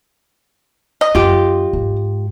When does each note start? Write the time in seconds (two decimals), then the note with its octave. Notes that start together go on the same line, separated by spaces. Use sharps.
1.01 D#5
1.15 F#2 F4 G4
1.73 G#2